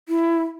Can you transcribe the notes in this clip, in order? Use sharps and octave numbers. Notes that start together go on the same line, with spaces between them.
E4